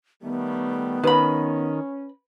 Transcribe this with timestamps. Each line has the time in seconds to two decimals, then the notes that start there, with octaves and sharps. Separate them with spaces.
0.22 D#3 G3 A3 B3
1.04 D#3 C#4 B4 B5